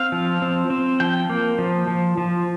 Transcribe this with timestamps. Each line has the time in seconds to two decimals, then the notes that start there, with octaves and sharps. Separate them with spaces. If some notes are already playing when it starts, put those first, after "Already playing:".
Already playing: C4 F5
0.12 F3
0.42 C4
0.70 C4
1.00 F3 G5
1.30 A#3
1.58 F3
1.88 F3
2.17 F3